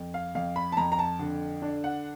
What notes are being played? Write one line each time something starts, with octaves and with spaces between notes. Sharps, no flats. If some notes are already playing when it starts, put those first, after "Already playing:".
Already playing: F2
F5
F2 F5
B5
A5
F2 A#5
A#5
A5
D3
D4
F#5